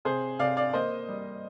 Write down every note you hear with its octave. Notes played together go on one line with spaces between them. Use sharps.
C3 G#4 C5
C3 D5 F5
D5 F5
A#3 C5 D#5
G3